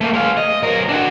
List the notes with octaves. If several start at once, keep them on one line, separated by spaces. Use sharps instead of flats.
A3 A#3
G#3 F5
D#5
B1 A#4
D4 F#4